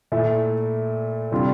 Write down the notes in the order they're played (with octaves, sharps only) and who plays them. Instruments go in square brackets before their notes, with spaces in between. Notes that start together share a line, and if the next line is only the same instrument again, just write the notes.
[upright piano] A#2 A3 E4
C3 G3 D4 F4